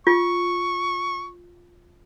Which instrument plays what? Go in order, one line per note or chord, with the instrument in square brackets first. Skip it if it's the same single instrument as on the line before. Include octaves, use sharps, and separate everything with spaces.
[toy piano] F4 [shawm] C#6